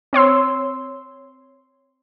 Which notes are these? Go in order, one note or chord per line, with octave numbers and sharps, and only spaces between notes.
C4 C#5 C6 E6